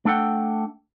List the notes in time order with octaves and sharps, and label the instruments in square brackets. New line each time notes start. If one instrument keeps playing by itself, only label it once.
[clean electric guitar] A3 D4 A4 F#5 G5